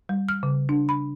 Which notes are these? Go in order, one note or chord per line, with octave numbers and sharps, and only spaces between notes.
G3
F6
C#3
D4
B5